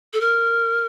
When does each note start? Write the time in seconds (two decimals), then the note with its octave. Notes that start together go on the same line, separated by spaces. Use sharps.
0.13 A4
0.21 A#4